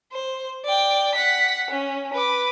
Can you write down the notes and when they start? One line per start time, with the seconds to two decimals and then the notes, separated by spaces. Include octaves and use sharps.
0.12 C5
0.65 D5 G5
1.15 F#5 B6
1.70 C#4
2.13 B4 D6